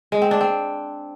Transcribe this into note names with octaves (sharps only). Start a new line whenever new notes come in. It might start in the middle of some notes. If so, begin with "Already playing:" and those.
G#3
C4
D4
C4